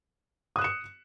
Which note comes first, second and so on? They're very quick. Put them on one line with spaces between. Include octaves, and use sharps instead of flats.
D#6 F#6 E7 C#7